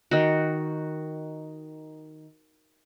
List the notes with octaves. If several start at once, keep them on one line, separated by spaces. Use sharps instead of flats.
D#3 F#4